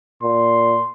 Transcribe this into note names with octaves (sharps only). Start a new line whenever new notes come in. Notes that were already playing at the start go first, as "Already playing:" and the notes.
A#2 C6